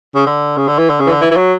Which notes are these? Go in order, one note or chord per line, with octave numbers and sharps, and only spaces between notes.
C#3
D3
C#3
D3
E3
D3
C#3
E3
D3
E3
E3
F#3